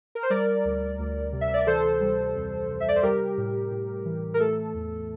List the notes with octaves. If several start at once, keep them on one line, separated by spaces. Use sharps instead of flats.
A#4
C5
G3 A#4 D5
D2
D2
C3
E5
D5
E3 A4 C5
G3
F2
C3
E5
D5
C5
G3 G4 A#4
A2
A2
E3
A#4
A3 A4
E2